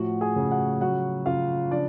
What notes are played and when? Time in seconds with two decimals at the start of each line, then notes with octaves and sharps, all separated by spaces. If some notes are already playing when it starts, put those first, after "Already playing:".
Already playing: A2 F3 F#4 F#5
0.21 G#4 G#5
0.36 C#3
0.51 F#4 F#5
0.81 F#3 F#4 F#5
1.26 C#3 F4 F5
1.71 F3 D4 D5